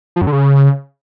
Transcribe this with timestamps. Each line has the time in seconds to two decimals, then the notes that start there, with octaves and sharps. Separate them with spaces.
0.16 F3
0.21 F#2
0.27 D3
0.32 C#3